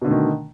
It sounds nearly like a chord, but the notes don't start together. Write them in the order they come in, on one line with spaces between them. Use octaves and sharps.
B2 D3 A3 D#3